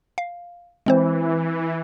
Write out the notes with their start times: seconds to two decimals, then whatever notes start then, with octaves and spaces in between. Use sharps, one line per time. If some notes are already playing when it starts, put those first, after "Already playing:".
0.18 F5
0.86 E3 G#3 C4 C5